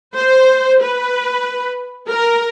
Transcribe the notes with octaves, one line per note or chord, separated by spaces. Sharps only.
C5
B4
A#4